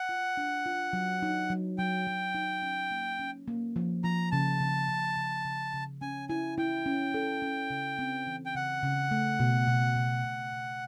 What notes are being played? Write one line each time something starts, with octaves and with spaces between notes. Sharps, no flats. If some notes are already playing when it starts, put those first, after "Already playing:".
Already playing: F#5
F4
D4
F4
F#3
D#4
F#3
F#3 G5
F#3
D#4
C#4
A#3
C#4
A#3
F3
F3 A#5
C#3 A5
C#3
C#3
C#3
C#3
C#3
C#4 G#5
E4 G#5
E4 G5
C#4
A4
C#4
C#3
C4
E3
G5
C#3 F#5
C#3
A3
B2
B2
B2
B2
B2